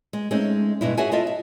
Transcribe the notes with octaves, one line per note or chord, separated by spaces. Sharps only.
G#3
G#3 A3 C4 C#4 D#4
G2 B2 G#3 D4 E4
F#4 G#4 C#5 E5 F#5 G#5
E4 F4 A4 D#5 E5
E5